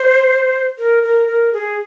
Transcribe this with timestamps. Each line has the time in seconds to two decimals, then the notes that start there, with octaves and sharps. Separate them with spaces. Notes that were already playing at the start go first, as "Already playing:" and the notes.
Already playing: C5
0.78 A#4
1.03 A#4
1.28 A#4
1.53 G#4